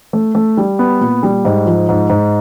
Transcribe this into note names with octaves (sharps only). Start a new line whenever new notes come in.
A3
A3
G3
B3
A#2
G3
G#2
F3
G#2
G#2